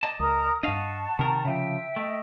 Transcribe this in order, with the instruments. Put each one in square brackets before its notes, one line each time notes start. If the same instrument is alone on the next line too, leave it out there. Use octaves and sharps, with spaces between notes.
[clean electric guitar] D5 D#5 A5
[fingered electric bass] C#2 [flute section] A#4 A#5 [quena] D#6
[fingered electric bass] G2 D4 [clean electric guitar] D#5 F5 [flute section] F#5 C#6 [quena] A5
[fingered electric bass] C3 [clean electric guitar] D#3 A#4
[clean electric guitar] C#3 F3 [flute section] E5 G5
[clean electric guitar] A3 [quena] D#5